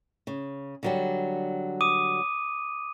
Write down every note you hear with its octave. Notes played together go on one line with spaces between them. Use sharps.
C#3
D3 F#3 G3
D6 D#6 D#7